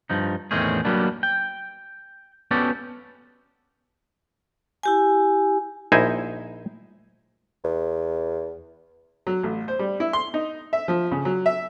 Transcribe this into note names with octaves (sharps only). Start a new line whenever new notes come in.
G2 F3 D#4
E2 A2 D#3 C4 C#4 G#4
F#3 G3 A#3 B3 D4
G5
B3 C#4 F#4 G4 A4 D5
E4 G4 G#5
A#1 D#4 E4 C5 G#5
E2
F#3
A1
C5
G3
E4
C6
D#4
E5
F3
C#3
F#3
E5